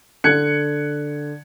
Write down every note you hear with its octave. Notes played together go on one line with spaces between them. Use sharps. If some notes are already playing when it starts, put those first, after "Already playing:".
D3 F#6 G#6 C#7